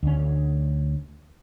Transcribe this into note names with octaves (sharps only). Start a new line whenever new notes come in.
D2 C#4